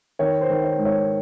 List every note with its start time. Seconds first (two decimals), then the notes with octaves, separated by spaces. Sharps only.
0.19 D#3 C#5
0.41 C5
0.50 D#3
0.64 C#5
0.78 G#2
0.85 C#5